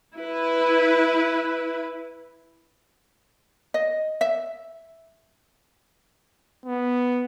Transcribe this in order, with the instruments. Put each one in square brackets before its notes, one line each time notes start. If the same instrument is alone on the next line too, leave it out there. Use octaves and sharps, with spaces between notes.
[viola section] E4 B4
[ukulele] D#5
E5
[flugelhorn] B3